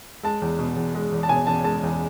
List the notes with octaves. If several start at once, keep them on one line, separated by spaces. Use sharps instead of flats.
G#3 A5
E2
B2
E2
G#3
E2
A5
B2 G#5
E2 A5
G#3 A5
E2